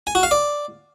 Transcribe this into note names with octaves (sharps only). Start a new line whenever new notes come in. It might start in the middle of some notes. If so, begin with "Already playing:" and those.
G#5
F#4
F5
D5